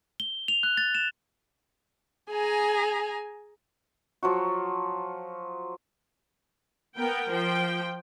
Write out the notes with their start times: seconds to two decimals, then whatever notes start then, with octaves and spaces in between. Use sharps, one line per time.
0.20 G7
0.48 F7
0.63 F#6
0.77 A6
0.95 E7
2.31 G#4 G#5 A#5
4.23 F3 F#3 F#4
6.96 B3 A#4 G5
7.31 F3 G5